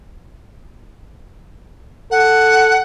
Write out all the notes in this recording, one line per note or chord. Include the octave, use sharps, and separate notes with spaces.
A4 F#5